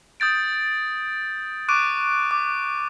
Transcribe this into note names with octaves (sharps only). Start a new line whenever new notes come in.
D#6 G6 A6 D7
C#6 D6 F#6 D7 D#7
D6